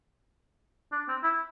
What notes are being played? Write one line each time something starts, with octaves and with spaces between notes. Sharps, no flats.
D4
C4
E4